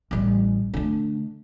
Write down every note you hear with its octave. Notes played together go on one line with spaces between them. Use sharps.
A1 G3
D3 A3